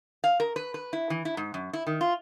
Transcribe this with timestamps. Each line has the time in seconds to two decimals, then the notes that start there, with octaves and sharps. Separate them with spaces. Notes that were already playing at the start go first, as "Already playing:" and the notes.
0.24 F5
0.40 A#4
0.56 B4
0.74 B4
0.93 E4
1.10 E3
1.25 E4
1.37 G#2
1.54 F#2
1.73 E4
1.87 D#3
2.01 F4